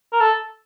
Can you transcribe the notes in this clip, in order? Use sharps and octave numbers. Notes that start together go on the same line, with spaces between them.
A#4
A4